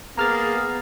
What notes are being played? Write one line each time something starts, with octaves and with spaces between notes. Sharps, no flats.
A#3 B3 G#4 A#5 F6 A6